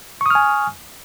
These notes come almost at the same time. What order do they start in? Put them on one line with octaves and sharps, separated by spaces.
C#6 D#6 F6 G#5